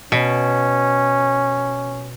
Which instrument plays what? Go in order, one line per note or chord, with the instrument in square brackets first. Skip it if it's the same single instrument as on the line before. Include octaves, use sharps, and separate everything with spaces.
[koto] B2 [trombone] C#4